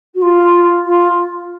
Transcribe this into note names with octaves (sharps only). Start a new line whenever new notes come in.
F#4
F4
F4